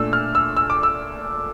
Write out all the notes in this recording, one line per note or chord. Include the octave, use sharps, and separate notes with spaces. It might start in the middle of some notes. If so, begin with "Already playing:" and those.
Already playing: A#2 A3 D4 E6
F6
E6
E6
D6
E6